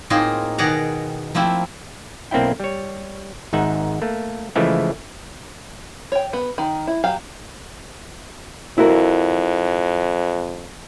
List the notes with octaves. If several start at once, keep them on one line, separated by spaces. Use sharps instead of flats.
A2 A#3 C4 D#4 F4 G#4
B2 D#3 G#4 D5 F#5 A#5
F3 A3 A#3 C4 E4
B1 A#3 C4 D4 E4 G5
G3 C#5
G#1 G#2 D#4 E5 F#5
A3 A#3
C#3 E3 F3 G#3 A3 E4
C#5 G5
B3
D#3
E4
F#3 G4 F5
F2 E4 F#4 A#4